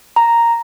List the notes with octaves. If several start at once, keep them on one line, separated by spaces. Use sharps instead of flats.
A#5